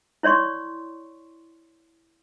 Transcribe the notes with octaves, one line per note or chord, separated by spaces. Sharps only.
E4 C#5 D5 C6 C#6